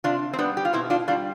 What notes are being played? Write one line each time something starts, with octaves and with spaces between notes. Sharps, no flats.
C3 D4 F4
C4
G3 B3 D4
G4
F4
B2 C4 E4
D4 F4
G3 D4 F4